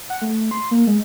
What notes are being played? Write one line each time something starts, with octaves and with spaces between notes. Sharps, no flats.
F#5
A3
C6
A#3
G#3